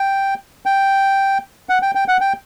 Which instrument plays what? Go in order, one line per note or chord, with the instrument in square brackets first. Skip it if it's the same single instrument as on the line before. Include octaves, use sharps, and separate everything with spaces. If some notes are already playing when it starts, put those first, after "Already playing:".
Already playing: [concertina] G5
G5
F#5
G5
G5
F#5
G5